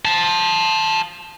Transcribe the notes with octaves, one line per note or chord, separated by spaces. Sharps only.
F5 A5